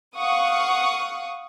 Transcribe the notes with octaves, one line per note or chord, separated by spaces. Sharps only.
F5 F#5 C#6 D#6